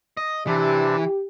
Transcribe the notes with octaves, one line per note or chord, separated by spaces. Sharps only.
D#5
C3 E3 D4 G4